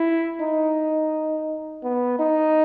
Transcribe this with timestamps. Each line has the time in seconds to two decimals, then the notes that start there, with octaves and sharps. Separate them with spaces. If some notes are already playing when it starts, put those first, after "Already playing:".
Already playing: E4
0.41 D#4
1.83 B3
2.19 D#4